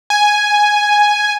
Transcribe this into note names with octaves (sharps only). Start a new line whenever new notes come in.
G#5